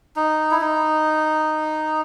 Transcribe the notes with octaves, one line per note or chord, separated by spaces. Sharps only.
D#4
E4
D#4